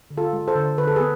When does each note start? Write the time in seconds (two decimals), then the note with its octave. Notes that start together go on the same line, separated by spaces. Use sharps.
0.10 D3
0.17 F4 A4
0.33 G#3
0.48 A4 C5
0.56 D3
0.78 D3 B4
0.87 A4
0.96 B3 G#4 B4